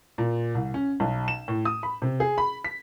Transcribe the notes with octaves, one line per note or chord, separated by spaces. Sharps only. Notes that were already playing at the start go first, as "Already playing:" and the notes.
A#2
C2
C#4
B1
E7
A2
D#6
B5
C3
G#4
B5
B6